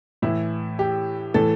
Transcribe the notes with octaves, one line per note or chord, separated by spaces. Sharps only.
A2 E3 E4
G4
A2 E3 A4